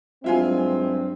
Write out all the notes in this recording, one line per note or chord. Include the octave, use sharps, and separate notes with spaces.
G2 F#3 G#3 C4 D4 E4 F4 G#5